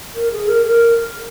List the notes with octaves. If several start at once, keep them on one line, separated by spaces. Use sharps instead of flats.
A#4
G#4
A#4
A#4